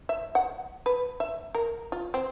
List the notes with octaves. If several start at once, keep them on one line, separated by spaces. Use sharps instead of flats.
E5
F#5
B4
E5
A#4
F4
C4